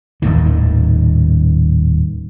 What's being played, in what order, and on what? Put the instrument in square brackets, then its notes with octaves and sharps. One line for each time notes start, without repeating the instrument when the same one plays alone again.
[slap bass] D#1 C2 A2 D#3